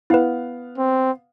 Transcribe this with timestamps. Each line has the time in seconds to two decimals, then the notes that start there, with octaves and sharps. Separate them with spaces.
0.10 B3 E4 B4 F5 F#5
0.78 C4